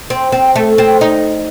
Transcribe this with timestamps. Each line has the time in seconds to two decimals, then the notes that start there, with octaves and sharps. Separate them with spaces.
0.10 C4
0.32 C4
0.56 A3
0.78 C4
1.01 D#4